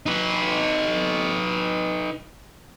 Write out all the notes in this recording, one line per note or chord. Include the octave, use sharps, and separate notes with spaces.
D#4 B4